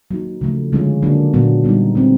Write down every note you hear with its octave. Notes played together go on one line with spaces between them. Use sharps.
F#3 A#3 D#4
C#3 F3 A3
D3 F3 G#3 C#4 F4
D3 F#3 A#3 D4
A#2 F#3 B3 D4
G3 B3 D#4
G#3 C4 D#4